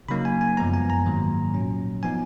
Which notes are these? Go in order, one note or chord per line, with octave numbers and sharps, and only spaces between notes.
C#3 F#3 A#3 D#4 B5
G#5
G#5
F#2 F3 G#3 B3 A#5
G#5
A#5
G#2 D#3 F#3 A#3
A#2 F#3 C#4
F3 B3 D#4 G#5